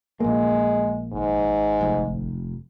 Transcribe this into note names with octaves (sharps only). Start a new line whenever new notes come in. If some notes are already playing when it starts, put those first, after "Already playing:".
A#1 G#3 A#3
G#1 G#2
F1